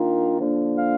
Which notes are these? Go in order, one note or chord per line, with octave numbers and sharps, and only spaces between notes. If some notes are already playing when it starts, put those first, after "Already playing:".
Already playing: D#3 A#3 D4 F4
D3 F3 A#3 D4
F5